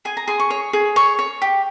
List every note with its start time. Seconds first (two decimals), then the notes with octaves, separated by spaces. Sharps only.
0.05 G#4 G#5
0.17 A#5
0.27 G#4 C6
0.40 C#6
0.50 C#5
0.73 G#4
0.96 C#5 C#6
1.19 C#5
1.42 G4